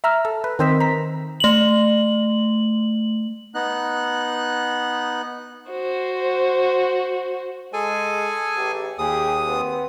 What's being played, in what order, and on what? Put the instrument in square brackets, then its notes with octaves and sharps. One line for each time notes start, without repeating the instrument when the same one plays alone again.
[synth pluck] E5 A#5 E6 F6
A4
B4
D#3 C4 C5 D#5 E6 B6
A#5 B6
[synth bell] A3 F#7
[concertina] B3 D#4 F#6
[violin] F#4 C5
[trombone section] G#3 [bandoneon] G#4 A4 G#5
[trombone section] A1 G4
[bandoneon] D#2 D#6 [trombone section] G4 G#4
[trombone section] B3 C4